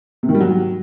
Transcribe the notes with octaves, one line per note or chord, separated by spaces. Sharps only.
C3
D#3
G3
F#3